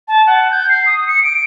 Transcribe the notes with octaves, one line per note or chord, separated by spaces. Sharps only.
A5
F#5
G6
C7
D#6
C#7
D7